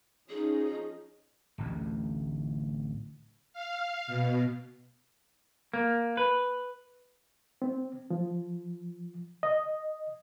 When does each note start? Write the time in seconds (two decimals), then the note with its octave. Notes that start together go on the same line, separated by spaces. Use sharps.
0.29 F3 C#4 D#4 G#4
1.58 D1 A1 D2
3.53 F5
4.07 B2
5.73 A#3
6.17 B4
7.62 C4
8.10 F3
9.43 D#5